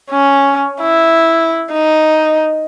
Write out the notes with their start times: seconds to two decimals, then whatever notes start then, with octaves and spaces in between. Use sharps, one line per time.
0.11 C#4
0.82 E4
1.72 D#4